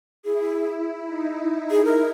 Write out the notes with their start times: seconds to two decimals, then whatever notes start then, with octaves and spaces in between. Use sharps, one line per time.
0.24 E4 G#4
1.05 D#4
1.71 G#4
1.85 A#4